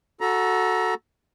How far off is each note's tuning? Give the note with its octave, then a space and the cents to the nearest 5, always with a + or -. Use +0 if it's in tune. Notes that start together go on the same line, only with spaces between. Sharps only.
F#4 -10 A4 -5 A#5 +25